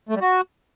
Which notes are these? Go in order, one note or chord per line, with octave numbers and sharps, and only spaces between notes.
A3
G3
F#4